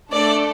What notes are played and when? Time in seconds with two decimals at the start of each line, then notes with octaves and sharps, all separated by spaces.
0.12 A3 D4 A4 D5